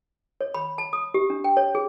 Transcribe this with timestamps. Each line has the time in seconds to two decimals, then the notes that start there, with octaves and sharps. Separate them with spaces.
0.41 C#5
0.54 B5
0.78 A5
0.93 D#6
1.14 G4
1.30 D4
1.44 G5
1.57 C#5
1.75 G#4